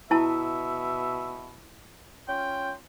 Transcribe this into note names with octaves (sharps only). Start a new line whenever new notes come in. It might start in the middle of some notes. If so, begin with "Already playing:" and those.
B2 E4 E5 A5
C#4 F4 G5